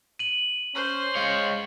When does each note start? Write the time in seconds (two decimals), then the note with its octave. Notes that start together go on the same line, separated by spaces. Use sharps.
0.19 D#7 F#7
0.75 C#4 C5
1.16 G#3 C#5 F5